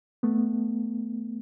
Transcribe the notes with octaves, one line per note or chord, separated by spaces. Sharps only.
A3 B3